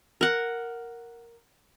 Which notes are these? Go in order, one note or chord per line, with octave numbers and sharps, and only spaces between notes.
A#4 F#5